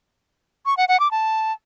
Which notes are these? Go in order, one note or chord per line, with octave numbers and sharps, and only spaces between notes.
C#6
F#5
F#5
D6
A5